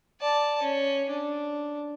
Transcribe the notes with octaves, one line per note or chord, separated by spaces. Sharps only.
D5 A5
C#4
D4